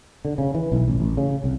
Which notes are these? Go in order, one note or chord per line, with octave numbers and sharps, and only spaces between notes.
D3
C#3
E3
B1
A1
A1
C#3
C2